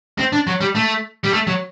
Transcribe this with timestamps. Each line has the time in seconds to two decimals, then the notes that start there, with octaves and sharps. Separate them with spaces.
0.19 C4
0.32 D4
0.47 F#3
0.61 G3
0.75 A3
1.24 G3
1.33 A3
1.47 F#3